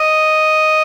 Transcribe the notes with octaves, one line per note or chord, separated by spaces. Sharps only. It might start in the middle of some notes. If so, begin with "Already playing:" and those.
Already playing: D#5